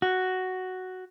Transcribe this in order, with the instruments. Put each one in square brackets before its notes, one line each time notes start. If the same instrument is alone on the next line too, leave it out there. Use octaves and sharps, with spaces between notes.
[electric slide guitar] F#4